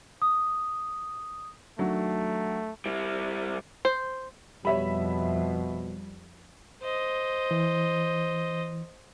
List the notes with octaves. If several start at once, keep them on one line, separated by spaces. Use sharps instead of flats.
D#6
D#3 F#3 A3 D4
G3 E4
C5
F2 B2 G3 C#5 E5 B5
C5 D#5
E3